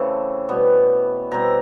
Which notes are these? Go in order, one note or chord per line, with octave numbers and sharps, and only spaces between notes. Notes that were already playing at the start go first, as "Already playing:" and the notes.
Already playing: C#3 E3 A3 C4 A5
B2 G3 B3
B2 G3 C4 A#5